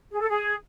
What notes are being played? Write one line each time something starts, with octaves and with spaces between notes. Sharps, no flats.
G#4
A4
G#4